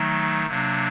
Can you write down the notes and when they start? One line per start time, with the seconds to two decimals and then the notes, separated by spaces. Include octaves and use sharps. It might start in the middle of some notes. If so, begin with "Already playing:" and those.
Already playing: D#3 F#3 A3 D#4
0.47 C3 F#3 A#3 D4